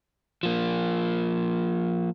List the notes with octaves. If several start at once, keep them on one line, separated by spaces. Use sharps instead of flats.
F3 A#3